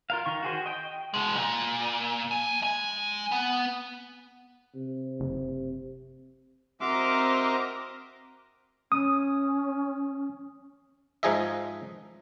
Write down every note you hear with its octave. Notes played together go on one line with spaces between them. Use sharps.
F4 A#4 F5
D#3 C#6
F#4 G#4 C5
D#5 G5
B2 G#3
A#2
F3 G#5
G#3 G#5
B3
C3
F#1
C4 F#4 A#4 D#5 E5 C6 D6 F6
C#4 D#6
G#2 F3 D#4 G#4 D#5 E5